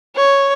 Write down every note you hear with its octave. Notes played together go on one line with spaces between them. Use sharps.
C#5